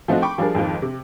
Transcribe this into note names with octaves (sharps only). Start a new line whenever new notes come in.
F3 A3 C4 D#4 F#4
G5 B5 C#6 D6
F3 G3 D4 G#4 A#4
F2 G#2 D#3 F3
C3